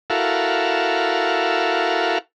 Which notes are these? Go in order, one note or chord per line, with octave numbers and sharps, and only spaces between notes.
E4 F#4 A4 A#4 F5